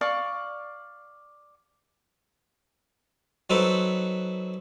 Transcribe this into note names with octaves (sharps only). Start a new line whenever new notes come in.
D5 F5 C#6
F#3 C4 D#4 F#4 A4 B4